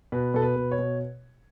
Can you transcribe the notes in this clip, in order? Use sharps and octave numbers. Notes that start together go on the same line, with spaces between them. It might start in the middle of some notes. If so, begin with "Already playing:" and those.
B2 B4
B2 A4
B4
B2
C#5
B2